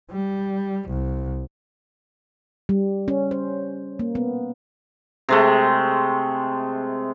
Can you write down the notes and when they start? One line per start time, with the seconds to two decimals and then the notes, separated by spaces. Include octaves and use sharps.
0.11 G3
0.90 C2
2.69 G3
3.08 C#4
3.31 C5
3.99 A#3
4.15 B3
5.29 C3 G#3 A3